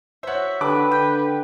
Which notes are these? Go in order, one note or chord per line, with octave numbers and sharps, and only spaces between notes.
F#4 C5 C#5 E5
D3 G4 B4 A5 D6 F#6
D3 G5